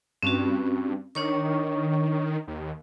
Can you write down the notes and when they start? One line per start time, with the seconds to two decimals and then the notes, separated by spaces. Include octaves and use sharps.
0.23 G2 C4 C#4 F#4
1.15 D#3 D4 C#5 C#6
2.47 D#2